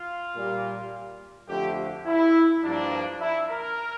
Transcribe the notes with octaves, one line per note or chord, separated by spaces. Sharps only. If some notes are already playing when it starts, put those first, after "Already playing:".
Already playing: F4
A#2 G3 A#3
F2 D3 F3 A3 G4
E4
G2 F3 A#3 D4
E4
A#4